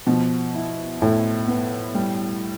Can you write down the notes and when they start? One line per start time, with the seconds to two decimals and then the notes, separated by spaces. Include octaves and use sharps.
0.07 B2 F3
0.55 E4
1.01 A2 E4
1.48 B3
1.95 G3